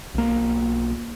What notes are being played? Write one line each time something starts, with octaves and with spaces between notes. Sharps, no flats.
B1 A#3